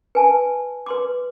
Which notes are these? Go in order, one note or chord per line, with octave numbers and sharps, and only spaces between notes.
B4 G#5 A5
B4 C6 D6